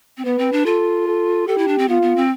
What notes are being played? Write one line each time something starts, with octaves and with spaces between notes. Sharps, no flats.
C4
B3 B4
C4
D4
F4 A4
A4
G4 A4
E4
D4
C4
B3 F4
B3
C4